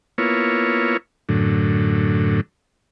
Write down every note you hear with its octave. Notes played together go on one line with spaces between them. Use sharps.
A#3 B3 E4 F4 C#5
F#2 A2 D3